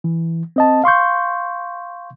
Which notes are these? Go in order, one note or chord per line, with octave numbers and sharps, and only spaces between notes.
E3
C4 D#5 A5
F5 C6 C#6 G6